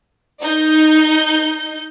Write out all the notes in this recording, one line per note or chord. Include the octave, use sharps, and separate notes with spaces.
D#4 G6